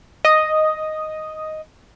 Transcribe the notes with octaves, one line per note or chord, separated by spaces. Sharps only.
D#5 D#6